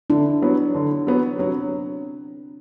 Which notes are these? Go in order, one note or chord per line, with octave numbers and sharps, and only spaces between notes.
D3 D4 E4
F#3 B3
D3
F#3 B3
F#3 C4 D4